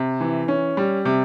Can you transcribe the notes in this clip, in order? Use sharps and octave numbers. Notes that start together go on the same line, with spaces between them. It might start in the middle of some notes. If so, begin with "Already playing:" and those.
Already playing: C3
E3
C#4
G3
C3